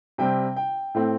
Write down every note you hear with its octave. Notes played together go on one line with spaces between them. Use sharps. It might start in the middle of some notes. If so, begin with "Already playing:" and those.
C3 G3 C4 G5
G5
A2 A3 C4